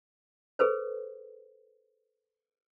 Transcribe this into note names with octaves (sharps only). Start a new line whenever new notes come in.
G#4 A4 B4 C5